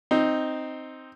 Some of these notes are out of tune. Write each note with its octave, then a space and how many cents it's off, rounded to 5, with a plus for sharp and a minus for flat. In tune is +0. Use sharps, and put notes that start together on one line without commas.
C4 +0 D#4 +0